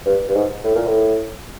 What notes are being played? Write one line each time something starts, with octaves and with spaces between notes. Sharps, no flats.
G2
G2
G#2
A2
A#2
A2